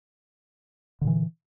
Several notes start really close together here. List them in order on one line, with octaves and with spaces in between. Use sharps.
D3 A#2 E3